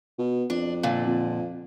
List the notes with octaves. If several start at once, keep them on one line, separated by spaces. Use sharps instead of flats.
B2
F2 D4
A#2 D3
F2